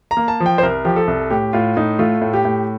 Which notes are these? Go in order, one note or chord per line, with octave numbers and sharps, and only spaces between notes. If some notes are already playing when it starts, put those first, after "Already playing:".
A#5
A#3
A5
F3
G5
C5
C2 A#4
F3 G4
A4
C2
A2 G4
A2 F4
A2 D#4
A3 F4
A2
G4
A2